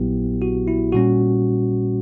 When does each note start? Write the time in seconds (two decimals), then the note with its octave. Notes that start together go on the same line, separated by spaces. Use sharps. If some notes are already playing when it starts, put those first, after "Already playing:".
Already playing: A#1 A#2 F#3 B3 E4 G4
0.42 F#4
0.67 E4
0.92 A#2 G3 C#4 F#4